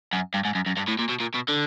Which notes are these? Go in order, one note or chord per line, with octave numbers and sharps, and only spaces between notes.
F#2
G2
G#2
F#2
F#2
G2
A2
A#2
B2
A#2
B2
D3